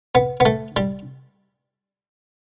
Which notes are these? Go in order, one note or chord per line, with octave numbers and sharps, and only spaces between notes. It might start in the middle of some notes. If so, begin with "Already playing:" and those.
B3
B3
A3
G3